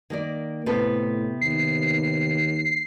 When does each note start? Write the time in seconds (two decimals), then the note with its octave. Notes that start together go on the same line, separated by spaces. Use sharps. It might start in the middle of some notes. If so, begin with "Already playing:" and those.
0.10 D#3 A#3 D5
0.66 A2 C3 B3 A4
1.41 D#2 C7